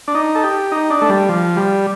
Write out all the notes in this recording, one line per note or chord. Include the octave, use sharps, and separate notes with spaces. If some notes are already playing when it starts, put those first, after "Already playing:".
D4
D#4
A4
G4
D#4
D4
A3
G3
F3
G3